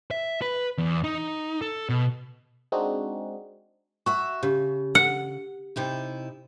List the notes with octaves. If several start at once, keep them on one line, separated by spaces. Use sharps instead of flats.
E5
B4
E2
D#4
A4
B2
G#3 C4 D4 D#4 F#4 G#4
F#4 E5 C#6
C#3 G4
F#5
C3 D#4 E4